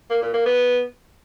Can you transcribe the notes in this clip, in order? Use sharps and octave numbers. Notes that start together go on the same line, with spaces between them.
A#3
A#2
A#3
B3